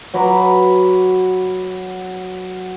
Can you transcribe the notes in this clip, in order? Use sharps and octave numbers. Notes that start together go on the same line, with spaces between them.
F#3 B4 A#5 D6